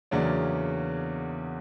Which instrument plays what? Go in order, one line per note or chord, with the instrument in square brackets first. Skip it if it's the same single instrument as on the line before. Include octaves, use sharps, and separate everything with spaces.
[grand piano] E2 C#3 F#3 A#3 C#4 D4 D5